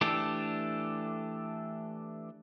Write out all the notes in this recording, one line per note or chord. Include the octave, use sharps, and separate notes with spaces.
E3 A3 D4 G4 A4